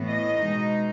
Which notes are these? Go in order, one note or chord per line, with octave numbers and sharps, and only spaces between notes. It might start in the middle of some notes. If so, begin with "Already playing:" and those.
Already playing: A2 E3 B3
D#5
B2 G#3 D#4